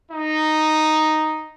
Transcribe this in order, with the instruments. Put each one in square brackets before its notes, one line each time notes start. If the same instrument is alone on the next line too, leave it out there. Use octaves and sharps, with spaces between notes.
[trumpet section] D#4